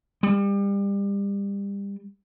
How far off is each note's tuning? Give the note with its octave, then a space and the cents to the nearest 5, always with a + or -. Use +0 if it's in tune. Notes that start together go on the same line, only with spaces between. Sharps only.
G3 +30